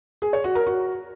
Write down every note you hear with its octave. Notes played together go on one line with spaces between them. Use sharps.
G#4
C#5
F#4
A#4
F#4